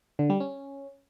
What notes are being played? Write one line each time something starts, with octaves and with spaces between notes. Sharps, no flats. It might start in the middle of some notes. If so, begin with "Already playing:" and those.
D3
G3
C#4